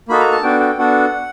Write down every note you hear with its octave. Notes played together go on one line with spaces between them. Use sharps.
A#3 D#4 F#4 A4 B5
A#5
A5
B3 D4 F#4 A4 G5
G5
B3 D4 F#4 A4 F#5